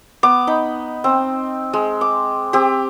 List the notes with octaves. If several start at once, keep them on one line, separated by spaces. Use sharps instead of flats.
B3 D6
D#4 B5
C4
G#3
D6
C4 G4